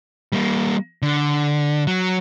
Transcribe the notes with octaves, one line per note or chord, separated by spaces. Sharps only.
G3 A#3
D3
F#3